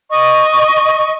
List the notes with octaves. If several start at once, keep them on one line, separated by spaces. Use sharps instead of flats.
D#5 C#6